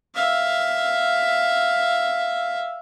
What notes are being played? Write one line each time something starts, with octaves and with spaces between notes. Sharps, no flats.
E5 F5